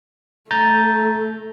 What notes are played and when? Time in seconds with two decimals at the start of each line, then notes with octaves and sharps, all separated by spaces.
0.51 A3 A#5 G6 A6